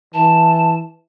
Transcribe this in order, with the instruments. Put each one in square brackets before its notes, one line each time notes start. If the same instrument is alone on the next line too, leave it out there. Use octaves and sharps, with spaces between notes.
[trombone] E3 [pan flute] A5